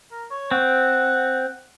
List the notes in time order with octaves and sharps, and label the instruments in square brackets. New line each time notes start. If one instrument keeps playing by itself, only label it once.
[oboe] A#4
C#5
[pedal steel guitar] C4 [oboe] F#5